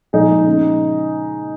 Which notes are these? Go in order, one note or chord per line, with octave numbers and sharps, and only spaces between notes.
A#2 F3 G#3 D#4 G#4
C#3 G#3